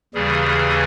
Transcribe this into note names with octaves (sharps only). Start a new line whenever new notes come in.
D#2 C#3 E3 G3 G#4